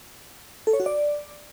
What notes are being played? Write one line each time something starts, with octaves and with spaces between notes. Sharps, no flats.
A4
C#5
F#4
D5